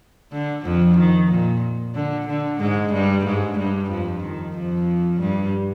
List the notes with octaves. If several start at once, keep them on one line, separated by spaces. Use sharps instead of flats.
D3
F2 F3
D#3
A#2
D3
D3
G#2 G#3
G2 G3
G#2 G#3
G2 G3
F2 F3
D#3
F2 F3
G2 G3